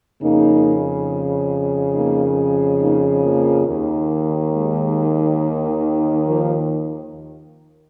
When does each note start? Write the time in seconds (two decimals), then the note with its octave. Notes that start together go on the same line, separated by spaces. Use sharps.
0.22 F2 C#3 A#3 D#4
1.94 A#3 D#4
2.80 A#3 D#4
3.23 F3 A#3
3.67 D#2 D#3
4.53 G#3
6.26 F3 A#3